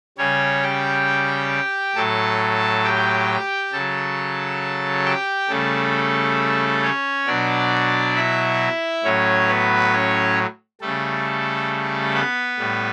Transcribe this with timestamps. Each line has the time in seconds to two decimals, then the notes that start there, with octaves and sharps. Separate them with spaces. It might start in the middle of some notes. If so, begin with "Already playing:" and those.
0.18 C#3 G3 C#4 C#5
0.62 G4 G5
1.95 A2 F#3 A4 A5
2.84 G4 G5
3.72 C#3 F#3 A4 A5
5.05 G4 G5
5.49 C#3 G3 A3 A4
6.83 C#4 C#5
7.27 B2 F#3 D4 D5
8.15 E4 E5
9.04 A2 F#3 C#4 C#5
9.48 B3 B4
9.92 C#4 C#5
10.81 C#3 G3 A3 A4
12.14 B3 B4
12.58 A2 G3